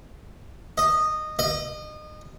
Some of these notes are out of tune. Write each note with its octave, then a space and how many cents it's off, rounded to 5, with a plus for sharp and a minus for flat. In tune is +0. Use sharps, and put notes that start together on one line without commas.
D#5 -15
D#5 -30